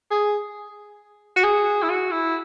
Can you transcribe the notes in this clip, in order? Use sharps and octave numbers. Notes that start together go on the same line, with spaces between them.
G#4
F#4
G#4
E4
F#4
E4